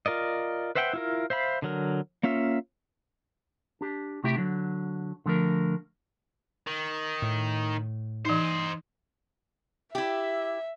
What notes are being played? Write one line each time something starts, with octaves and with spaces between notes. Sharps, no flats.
F4 A#4 D5 D#5
B4 C5 E5 F#5 G5
E4 F4 A#4
C5 E5 F5 B5
D3 F#3 A#4
A#3 C#4 F4 E5
D4 G4
C3 A3 E4 G4 E5
D3 F#3
D3 F3 A3 A#4
D#3
A2
E3 D#4 C5 D#5
E4 G4 E5